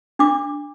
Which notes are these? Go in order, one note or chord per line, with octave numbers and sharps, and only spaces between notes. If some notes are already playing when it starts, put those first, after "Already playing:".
D4 D6